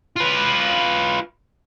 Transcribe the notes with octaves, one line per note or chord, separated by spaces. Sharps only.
F4 B4